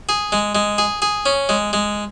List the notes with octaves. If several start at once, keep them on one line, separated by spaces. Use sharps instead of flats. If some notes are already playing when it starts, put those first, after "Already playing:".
G#4
G#3
G#3
G#4
G#4
C#4
G#3
G#3